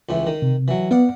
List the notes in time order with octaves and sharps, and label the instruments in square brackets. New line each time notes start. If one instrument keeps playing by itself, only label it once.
[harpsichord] C#2 A2 E3
D#3
[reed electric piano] C3
[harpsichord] E3 F#3
[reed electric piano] B3 [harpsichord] D5 F5 F#5